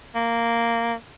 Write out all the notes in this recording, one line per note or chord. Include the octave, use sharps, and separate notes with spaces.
A#3